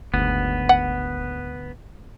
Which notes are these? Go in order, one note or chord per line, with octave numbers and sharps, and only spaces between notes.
F#1 D2 G#2 B3
F#5